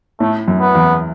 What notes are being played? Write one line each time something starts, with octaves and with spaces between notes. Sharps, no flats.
A2 A3
F#2
B3
E2